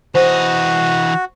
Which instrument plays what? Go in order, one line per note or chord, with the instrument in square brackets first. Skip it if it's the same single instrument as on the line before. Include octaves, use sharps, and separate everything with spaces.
[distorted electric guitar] E3 D#5 [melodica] F#4 [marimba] C5